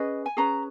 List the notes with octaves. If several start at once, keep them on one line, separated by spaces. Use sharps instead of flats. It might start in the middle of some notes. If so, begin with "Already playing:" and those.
Already playing: C#4 G#4 B4 D#5
G#5
C#4 G#4 B4 A#5